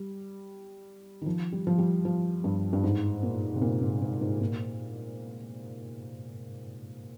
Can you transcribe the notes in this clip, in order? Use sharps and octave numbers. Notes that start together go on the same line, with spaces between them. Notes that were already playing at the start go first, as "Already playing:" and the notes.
Already playing: G3
D#3
F3
G3
F3
G3
F3
G2
G2
G#2
A#2
C3
A#2
G#2
G#2
G#2
A#2